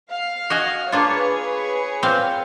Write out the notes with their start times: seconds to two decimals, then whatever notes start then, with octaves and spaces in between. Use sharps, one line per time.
0.11 F5
0.50 F#4 D#5 G#5
0.92 A#3 D4 F4 G#4 B4 C#5
2.03 A#2 C4 F5